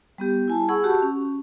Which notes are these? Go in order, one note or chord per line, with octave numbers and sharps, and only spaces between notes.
G3 B3 G4
E4 G#5 A5
G#4 F#5 B5 C#6 E6
F#4 G4 A5
C#4